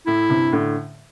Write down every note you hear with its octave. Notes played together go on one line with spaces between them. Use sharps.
A2 E4
G2 C3
A2 D3